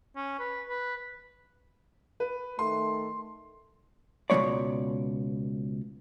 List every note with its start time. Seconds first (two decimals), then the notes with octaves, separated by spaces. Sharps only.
0.16 C#4
0.39 B4
0.69 B4
2.20 B4
2.59 D#3 A3 C6
4.30 C#2 B2 F3 A3 C#5 D5